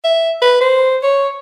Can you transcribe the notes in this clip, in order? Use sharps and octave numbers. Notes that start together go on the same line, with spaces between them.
E5
B4
C5
C#5